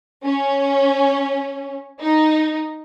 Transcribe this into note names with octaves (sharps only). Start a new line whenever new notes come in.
C#4
D#4